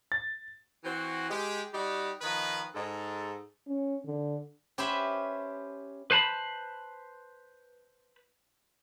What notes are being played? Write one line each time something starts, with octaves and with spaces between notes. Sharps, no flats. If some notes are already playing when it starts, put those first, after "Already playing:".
A6
E3 C4 F#4
G#3 G4
G3 D#4 F#4 G4
D#3 F3 D#4 B4
G#2 A4
C#4
D3
C#4 G4 B4 C5 E5 B5
B4 C5 A5 B5